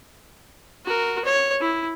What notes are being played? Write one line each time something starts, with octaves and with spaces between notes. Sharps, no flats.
F#4 A#4
C#5
E4